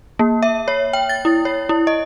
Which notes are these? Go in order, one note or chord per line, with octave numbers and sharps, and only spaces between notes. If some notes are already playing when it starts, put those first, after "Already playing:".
A#3
E5
C#5
G5
A6
E4
C#5
E4
D#5